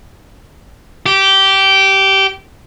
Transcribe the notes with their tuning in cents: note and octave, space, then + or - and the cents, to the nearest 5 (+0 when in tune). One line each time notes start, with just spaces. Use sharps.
G4 -15